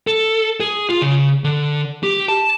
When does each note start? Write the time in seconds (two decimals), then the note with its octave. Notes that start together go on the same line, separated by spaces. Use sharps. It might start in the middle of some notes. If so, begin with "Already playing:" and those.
0.07 A4
0.60 G#4
0.90 F4
1.02 C#3
1.44 D3
2.03 G4
2.28 A5